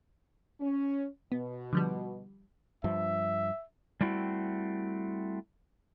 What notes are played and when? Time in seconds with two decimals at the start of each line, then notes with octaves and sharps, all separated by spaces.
0.61 C#4
1.32 B2 B3
1.73 D3 F3 G3
2.84 G2 F3 E5
4.01 G3 A3 C4 E4 F#4